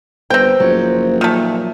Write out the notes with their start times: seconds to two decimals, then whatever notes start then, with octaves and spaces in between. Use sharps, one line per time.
0.30 G1 C4 B4 C5 G5
0.60 F#1 F3 F#3
1.21 A#2 D#3 A3